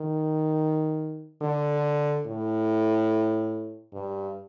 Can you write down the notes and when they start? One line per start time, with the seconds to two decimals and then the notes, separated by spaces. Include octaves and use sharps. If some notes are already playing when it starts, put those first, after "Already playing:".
Already playing: D#3
1.42 D3
2.26 A2
3.93 G2